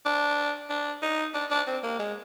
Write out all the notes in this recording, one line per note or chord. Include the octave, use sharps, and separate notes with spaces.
D4
D4
D#4
D4
D4
C4
A#3
G#3